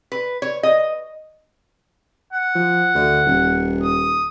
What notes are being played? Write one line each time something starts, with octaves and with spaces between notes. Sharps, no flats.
B4
C#5
D#5
F#5
F3
D2
D#1
D#6